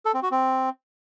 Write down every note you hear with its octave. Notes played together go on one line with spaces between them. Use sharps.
A4
C4
F#4
C4